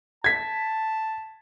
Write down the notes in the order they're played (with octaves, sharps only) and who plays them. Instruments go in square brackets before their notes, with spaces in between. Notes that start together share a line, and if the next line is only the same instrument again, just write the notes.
[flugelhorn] A5 [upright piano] G#6 B6